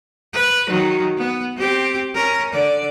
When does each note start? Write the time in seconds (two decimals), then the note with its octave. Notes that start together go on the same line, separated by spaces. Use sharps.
0.34 B4
0.68 D#3 F#3
1.18 B3
1.56 C4 G4
2.15 C#4 A#4
2.53 D3 D5